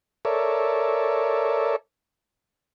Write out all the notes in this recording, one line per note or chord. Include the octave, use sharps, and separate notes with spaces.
A4 A#4 C#5 D5 E5